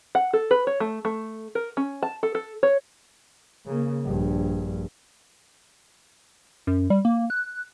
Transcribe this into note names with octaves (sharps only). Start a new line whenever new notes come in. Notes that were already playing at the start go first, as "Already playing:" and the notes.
F#5
A4
B4
C#5
A3
A3
A#4
C#4
A5
A4
A4
C#5
C#3 A#3
A#1 G2
F#2
G3
A#3
F#6